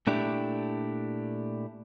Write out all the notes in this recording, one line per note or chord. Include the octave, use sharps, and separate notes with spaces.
A#2 A3 D4 E4 G4